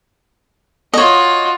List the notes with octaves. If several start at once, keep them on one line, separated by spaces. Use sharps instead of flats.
F4 F#4 C#5 D#5